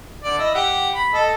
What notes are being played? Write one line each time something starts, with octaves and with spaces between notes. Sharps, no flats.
D3 D5
E4 D#5 E5
G4 F#5
B5
A4 D#5